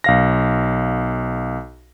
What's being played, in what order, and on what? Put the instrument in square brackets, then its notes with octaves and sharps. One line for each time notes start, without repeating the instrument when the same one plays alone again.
[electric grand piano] B1 F5 A#6